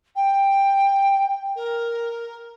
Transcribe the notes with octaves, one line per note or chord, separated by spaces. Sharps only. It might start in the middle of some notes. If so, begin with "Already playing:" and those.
G5
A#4